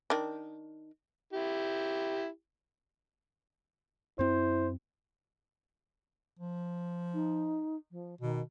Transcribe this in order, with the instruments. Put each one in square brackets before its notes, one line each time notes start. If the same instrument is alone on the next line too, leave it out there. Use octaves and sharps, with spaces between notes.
[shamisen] D#3 D4
[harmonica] E4 G4
[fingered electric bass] F#2 C4 [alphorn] E4 [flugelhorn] C5
[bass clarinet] F3
[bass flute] D#4
F3
[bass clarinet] B2 [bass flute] D#3